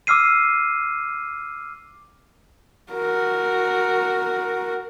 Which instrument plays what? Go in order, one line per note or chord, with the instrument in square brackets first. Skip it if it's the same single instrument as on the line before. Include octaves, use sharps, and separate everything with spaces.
[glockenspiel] D6 E6 F6 C7 D#7
[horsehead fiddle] F#4 A#4